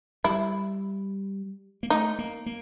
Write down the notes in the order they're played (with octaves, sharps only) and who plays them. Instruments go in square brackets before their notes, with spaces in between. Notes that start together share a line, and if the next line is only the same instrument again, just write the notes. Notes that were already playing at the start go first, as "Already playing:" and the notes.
[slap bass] G3 [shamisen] E4
[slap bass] A#3
[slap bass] A3 [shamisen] D#4
[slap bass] A#3
A#3